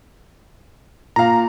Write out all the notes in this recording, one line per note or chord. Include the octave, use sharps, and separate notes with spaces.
A#2 F5 A#5